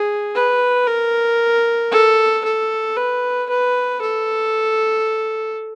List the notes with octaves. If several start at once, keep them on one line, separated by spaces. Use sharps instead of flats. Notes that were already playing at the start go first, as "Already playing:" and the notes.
Already playing: G#4
B4
A#4
A4
A4
B4
B4
A4